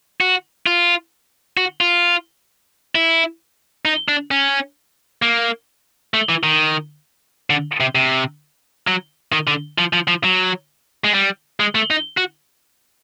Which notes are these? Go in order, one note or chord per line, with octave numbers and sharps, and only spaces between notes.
F#4
F4
F#4
F4
E4
D#4
D4
C#4
A#3
A3
E3
D#3
D3
C3
C3
F#3
D#3
D3
F3
F3
F3
F#3
G#3
G3
G#3
A3
D#4
F#4